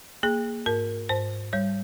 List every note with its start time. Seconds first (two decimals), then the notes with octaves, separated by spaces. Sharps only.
0.23 A#3 G#4
0.66 G#2 A#4
1.09 G#2 C5
1.53 G3 C#5